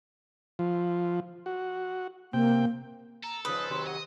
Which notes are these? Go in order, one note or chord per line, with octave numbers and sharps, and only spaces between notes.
F3
F#4
C3 A#3 G5
A4 A#5
G#2 C#3 F3 B4 D#6
C3 D#3 F#3 C6
D#5 F#5